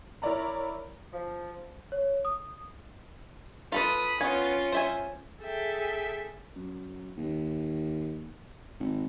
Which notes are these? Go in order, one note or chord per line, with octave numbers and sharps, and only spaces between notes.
E4 A#4 C#5 D5 A#5 B5
F3
C#5
D#6
F4 A4 B4 B5 D#6
B3 C#4 F4 G#5
C5 E5 G#5
G#4 A4 E5 G5
F#2
D#2
G#1